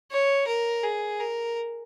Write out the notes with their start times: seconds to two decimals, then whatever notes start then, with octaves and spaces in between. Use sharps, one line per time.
0.12 C#5
0.48 A#4
0.84 G#4
1.20 A#4